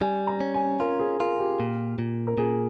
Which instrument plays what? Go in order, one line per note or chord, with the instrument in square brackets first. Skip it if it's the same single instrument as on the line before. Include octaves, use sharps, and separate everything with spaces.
[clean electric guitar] G3 [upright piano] G#5
[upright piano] A#5
[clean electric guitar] C#4
[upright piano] G#5
[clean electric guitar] F4 [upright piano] A#4
[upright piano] G#4
[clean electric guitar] F4 [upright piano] A#4
[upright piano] G4
[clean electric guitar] A#2
A#2
[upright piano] A#4
[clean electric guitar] A#2 [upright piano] G#4